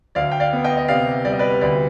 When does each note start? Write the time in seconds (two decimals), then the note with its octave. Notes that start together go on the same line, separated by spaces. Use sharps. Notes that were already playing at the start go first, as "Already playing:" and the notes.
0.15 D2 D5 F5
0.31 G5
0.40 D5 F5
0.53 B3
0.64 D#5 G5
0.77 D#5
0.88 C3 D5 F5
1.25 G3 D5
1.32 D#5
1.39 B4 D5
1.61 D2 B4 D5